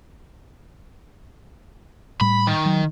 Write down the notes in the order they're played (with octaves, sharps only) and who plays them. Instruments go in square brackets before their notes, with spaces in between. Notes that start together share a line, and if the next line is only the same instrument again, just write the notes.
[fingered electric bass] A2 G3 [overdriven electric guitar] B5
[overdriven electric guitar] D#3
[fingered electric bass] F#3